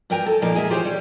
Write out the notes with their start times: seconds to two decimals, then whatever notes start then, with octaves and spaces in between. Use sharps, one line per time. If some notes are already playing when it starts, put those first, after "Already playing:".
0.10 G2 B3 A#4 G5 G#5 A#5
0.26 A4
0.42 A#2 F3 A#3 D#4
0.55 G#3 G#4 A#4 E5
0.70 F4 G4 G#4 C5 C#5
0.85 G3